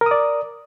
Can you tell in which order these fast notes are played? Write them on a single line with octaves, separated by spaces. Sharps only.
A#4 D#6 D5